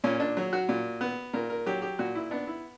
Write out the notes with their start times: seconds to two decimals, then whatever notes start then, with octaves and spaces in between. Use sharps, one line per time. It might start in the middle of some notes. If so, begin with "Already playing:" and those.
0.04 A#2 C#4
0.20 D4
0.37 F#3
0.53 F#4
0.69 A#2
1.01 B3
1.33 A#2 A#4
1.50 A#4
1.66 F#3 G4
1.82 G4
1.99 A#2 F#4
2.15 E4
2.31 B3 D4
2.47 E4